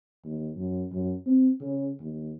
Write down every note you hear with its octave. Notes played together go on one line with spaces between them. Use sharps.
D#2
F#2
F#2
C4
C#3
D#2